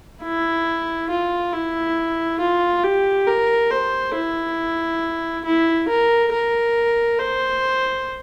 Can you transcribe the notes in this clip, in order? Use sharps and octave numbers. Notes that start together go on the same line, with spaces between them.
E4
F4
E4
F4
G4
A#4
C5
E4
E4
A#4
A#4
C5